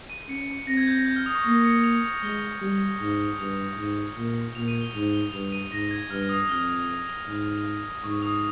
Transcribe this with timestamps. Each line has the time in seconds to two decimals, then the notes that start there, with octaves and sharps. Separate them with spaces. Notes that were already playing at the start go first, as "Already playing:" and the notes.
0.10 D#7
0.29 C#4 C#7
0.67 C4 A#6
0.77 G#6
0.87 G6
0.97 A#6
1.06 G6
1.16 F6
1.26 D#6
1.35 C#6
1.44 A#3 D#6
1.65 C#7
1.84 F7
2.23 G#3 G7
2.61 G3
3.00 G#2
3.39 G2 F7
3.77 G#2
4.17 A#2
4.55 A#2 F7
4.68 D#7
4.81 G7
4.94 G#2 F7
5.13 G7
5.32 G2 F7
5.52 D#7
5.71 G#2 A#6
5.91 G#6
6.10 G2 F6
6.29 D#6
6.49 F2 F6
7.27 G#2
8.04 G#2 C#6
8.22 D#6